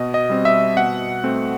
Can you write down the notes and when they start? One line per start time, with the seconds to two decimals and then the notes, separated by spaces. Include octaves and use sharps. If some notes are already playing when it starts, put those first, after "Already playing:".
Already playing: B2 D#5
0.14 D#5
0.29 G3 C4
0.45 E5
0.76 B2 F#5
1.24 A3 C4